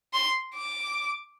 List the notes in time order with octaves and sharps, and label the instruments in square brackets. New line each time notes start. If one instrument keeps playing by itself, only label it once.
[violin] C6
D6